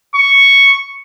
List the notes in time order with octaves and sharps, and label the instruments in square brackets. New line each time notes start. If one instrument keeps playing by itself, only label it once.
[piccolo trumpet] C#6